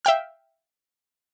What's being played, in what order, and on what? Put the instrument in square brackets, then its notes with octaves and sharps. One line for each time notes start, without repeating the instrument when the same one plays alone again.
[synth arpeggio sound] E5 F5 G5 F6